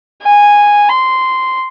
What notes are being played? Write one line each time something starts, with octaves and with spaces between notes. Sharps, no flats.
G#5
C6